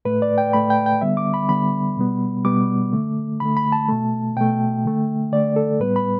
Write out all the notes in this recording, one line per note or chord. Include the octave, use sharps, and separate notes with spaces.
A2 A3 B4
D5
G5
A2 A3 B5
G5
G5
D3 G3 B3 E5
D6
B5
D3 G3 B3 B5
B2 G3 B3
B2 G3 B3 D6
D3 A3
D3 A3 B5
B5
A5
B2 A3
B2 A3 G5
D3 A3
D3 A3 D5
A4
A2 G3 B3 B4
B5